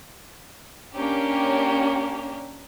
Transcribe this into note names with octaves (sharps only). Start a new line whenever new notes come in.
A#3 C#4 D4 G4